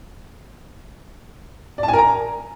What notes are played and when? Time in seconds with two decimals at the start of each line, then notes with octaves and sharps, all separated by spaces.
1.78 D5
1.83 A5
1.88 G#5
1.93 A#4
1.98 A#5